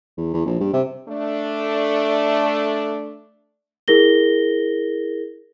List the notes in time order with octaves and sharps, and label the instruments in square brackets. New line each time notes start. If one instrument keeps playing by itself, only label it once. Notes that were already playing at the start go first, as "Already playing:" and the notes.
[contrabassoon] E2
E2
A#1
G2
C3
[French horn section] A3 D4
[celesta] E4 G#4 A#4 A#6 G7